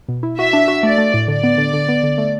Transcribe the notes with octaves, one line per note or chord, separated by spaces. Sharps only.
B2
E4
F#4 E5
D4
F#4
A3 D5
A3
A2
D3 D5
B3
D3
D3
B3
D3
A3